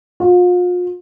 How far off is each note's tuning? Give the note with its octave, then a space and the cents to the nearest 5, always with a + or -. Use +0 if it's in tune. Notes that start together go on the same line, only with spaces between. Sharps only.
F4 +40